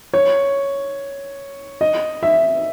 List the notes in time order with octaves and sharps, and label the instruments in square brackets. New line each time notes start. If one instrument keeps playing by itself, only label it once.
[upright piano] C#5
D#5
E5